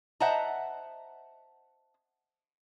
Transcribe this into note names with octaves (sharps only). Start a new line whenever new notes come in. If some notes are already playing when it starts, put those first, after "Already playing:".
C5 D#5 E5 F#5 A5 A#5